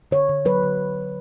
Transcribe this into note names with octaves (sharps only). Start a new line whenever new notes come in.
D3 C#5
D3
F#3 B4
D3